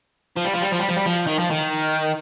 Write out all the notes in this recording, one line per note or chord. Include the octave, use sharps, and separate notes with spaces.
F3
G3
F3
G3
F3
G3
F3
G3
F3
D#3
F3
D#3